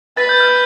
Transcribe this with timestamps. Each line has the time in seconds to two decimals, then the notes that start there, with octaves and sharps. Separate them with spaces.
0.17 B4 A6
0.29 G6
0.40 F6